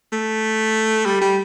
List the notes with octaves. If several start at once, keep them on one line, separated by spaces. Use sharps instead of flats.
A3
G3
G3